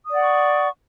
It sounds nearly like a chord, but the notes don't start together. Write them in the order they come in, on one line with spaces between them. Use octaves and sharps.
D#6 D5 F#5 C#6